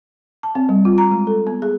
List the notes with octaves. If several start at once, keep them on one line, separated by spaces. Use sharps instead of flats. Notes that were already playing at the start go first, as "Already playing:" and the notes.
A5
C4
G3
F4
A#5
G#3
A4
B3
G#4